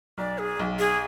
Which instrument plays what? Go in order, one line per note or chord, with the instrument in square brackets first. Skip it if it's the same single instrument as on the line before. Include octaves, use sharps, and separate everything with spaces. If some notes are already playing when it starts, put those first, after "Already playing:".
[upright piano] B1 [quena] D5
[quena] G#4
[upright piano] B1
[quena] G#4